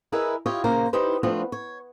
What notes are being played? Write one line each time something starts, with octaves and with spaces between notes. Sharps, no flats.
E4 G#4 A#4 B4 D#5 E5
E4 F4 G4 C#5 D#5 F5
A#2 C#3 A#3 C5 A#5
D#4 E4 G4 B4 C5
F3 A3 B3 C4 D4 F4
C#5